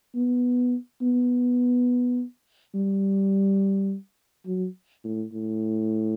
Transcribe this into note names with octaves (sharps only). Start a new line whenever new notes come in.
B3
B3
G3
F#3
A2
A2